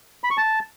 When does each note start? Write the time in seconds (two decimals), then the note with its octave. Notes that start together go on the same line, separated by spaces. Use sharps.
0.24 B5
0.31 C#6
0.37 A5